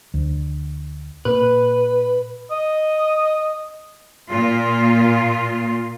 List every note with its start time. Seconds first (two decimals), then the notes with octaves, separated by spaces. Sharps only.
0.14 D2
1.25 A#2 B4
2.51 D#5
4.29 A#2 F4